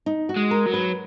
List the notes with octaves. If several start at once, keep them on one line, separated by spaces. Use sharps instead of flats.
D#4
F#4
G#3
A#4
F#3
B4